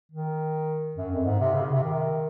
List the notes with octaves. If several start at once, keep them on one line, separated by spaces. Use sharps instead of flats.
D#3
F#2
F2
G#2
C3
C#3
C3
C3
D#3